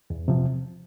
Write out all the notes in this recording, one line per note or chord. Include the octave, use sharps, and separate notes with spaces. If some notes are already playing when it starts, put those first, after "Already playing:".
E2
C3 F3